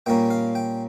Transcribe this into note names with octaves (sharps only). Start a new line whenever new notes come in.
A#2 G3 A#3 C#4 G5
F5
G5